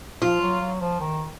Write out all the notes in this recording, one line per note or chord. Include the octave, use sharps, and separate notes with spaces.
F3 F4
F#3
F#3
F3
D#3